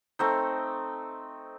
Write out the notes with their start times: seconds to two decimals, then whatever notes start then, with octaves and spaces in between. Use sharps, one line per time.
0.19 A3 C4 D#4